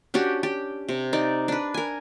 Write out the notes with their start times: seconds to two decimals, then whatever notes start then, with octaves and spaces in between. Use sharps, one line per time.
0.14 C#4 D4 F#4 G4
0.43 G4
0.89 C3
1.13 D#4 D5
1.48 D4 B4
1.74 A#4 G#5